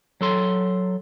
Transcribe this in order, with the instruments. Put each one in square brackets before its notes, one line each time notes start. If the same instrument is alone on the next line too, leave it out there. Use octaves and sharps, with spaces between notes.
[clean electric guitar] F#3 A4 C6